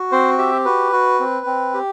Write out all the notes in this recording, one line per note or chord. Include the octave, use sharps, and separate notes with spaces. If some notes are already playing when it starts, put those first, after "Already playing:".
Already playing: F#4
C4 C5
G4 E5
F#4 B4
F#4
C4
C4
G4